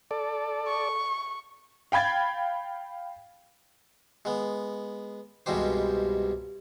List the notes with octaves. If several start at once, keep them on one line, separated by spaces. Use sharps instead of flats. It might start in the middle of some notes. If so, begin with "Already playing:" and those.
A4 D5
C#6
F5 G5 B5 G#6 A6
G#3 B3
C2 G2 B2 G#3 G4 C5